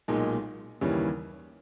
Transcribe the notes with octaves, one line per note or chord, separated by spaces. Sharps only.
B1 A#2 G#3 D#4
D#2 C#3 E3 G3 C#4